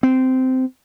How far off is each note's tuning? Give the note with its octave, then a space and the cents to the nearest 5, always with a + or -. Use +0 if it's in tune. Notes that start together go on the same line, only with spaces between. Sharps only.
C4 -15